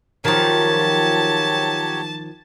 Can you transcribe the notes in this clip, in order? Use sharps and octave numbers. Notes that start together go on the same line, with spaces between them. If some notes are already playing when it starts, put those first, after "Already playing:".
D#3 F3 F#3 G4 C#5 A5